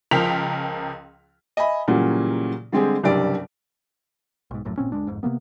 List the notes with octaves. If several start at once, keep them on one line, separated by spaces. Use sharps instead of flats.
C#2 F3 A#4 G5 B6 F7
D#5 E5 G#5 B5
A#2 C#3 E3 F#3 G3 A#3
D3 G3 G#3 C4 G4 G#4
F#1 C2 G2 G3 D5 D7
B1 G#2
D1 A#1 F#2 A2
G#1 A#2 C4 C#4
F#1 C#2 G#3 D4
G1 F2 G#2
C3 F3 A#3 B3